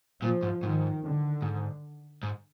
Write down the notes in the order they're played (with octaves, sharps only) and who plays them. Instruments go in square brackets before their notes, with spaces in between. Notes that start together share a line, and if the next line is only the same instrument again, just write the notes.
[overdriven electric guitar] A#2 [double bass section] F3
[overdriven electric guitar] G#2
[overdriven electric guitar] G#2 [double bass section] D#3
[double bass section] D3
[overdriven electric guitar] G#2
G#2